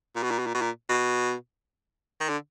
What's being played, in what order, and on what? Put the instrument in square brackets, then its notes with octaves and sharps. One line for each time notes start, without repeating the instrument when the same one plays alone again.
[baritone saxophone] A#2
B2
A#2
B2
A#2
B2
A#2
B2
D#3
D3